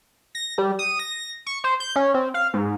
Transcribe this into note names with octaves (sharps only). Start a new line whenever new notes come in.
A#6
G3
D#6
A#6
C#6
C5
G6
C#4
C4
F5
G#2